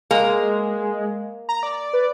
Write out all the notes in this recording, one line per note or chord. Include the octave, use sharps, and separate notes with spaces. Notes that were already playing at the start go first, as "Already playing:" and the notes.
G#3 A#3
A#5
D5
B4